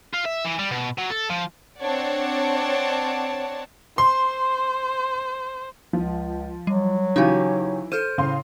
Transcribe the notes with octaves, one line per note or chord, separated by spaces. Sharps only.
F4
E5
E3
G3
B2
F#3
A4
F3
C4 D4 C#5 D5 F#5 A5
C5 C6
C#2 F3
F#3 G3
C#3 E3 D#4 F#4 G4 G#5
A4 C5 F6 D#7
A2 C#3 F5 C6